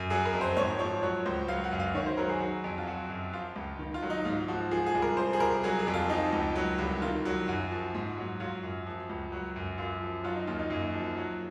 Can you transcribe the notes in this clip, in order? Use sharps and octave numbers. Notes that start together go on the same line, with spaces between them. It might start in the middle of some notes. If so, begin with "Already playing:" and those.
Already playing: F#2
F#3 G#4
A#4
F2
C5
G#2 C#5
F3 C#5
F#3 C#5
C#2 C5
F#3 F5
F#5
F#2
F5
D#3 C#5
C5
F#3 A#4
G#4
F#3
F2
F4
F#3 F#4
F#2
F3 F4
C#2
D#3
F4
F#3
D#4
G#2 F4
F3 F#4
F3 G#4
G#4
C2
A#4
F3 C5
G#4
C2 A#4
F#3 G#4
G#4
F2
F4
F3 D#4
C#2
F#3
C2
D#3 F4
F#3
F#2 F#4
F3
G#2
F#3
F#3 F4
F#2
F3
C#2
F#3
F#2
F#2 F4
F3
F#3 F4
D#4
D#2 F4
D#4
F#2
F3
F#3